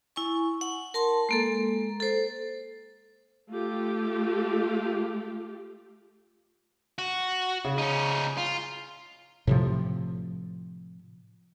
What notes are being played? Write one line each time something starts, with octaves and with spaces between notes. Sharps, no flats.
E4 G#5 C#6
F#5
A#4 A5 C6
G#3 A#3 A4
A4 C5
A3 F4 G4
F#4
C#3
C#4 D#4
F4
A2 C3 F3